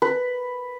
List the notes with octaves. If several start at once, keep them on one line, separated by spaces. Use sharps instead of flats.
B4